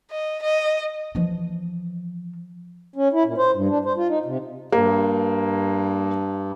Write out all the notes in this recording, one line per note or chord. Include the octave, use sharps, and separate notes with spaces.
D#5
D#5
E3 F3
C#4
E4
A#2
C5
G2
D4
C5
F4
D#4
C3
G2 A#3